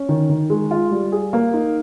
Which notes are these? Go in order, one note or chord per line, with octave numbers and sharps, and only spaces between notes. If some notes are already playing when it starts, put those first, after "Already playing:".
Already playing: C#4
D#3
D#3
G#3
F4
G3
G#4
A#3
D#4